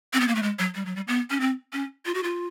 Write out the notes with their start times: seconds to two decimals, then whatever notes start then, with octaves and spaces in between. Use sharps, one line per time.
0.13 C4
0.20 B3
0.28 A#3
0.35 A3
0.43 G#3
0.59 F#3
0.75 G3
0.86 F#3
0.96 G3
1.08 B3
1.30 C#4
1.40 C4
1.73 C#4
2.06 F4
2.14 F#4
2.23 F4